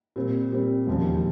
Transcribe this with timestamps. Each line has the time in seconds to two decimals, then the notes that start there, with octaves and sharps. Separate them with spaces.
0.16 A#2 G3 C4
0.52 A#2 G3 C4
0.87 E1 D#2 C#3 F3